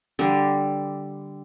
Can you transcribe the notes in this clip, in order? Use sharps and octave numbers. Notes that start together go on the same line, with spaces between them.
D3 G3 D4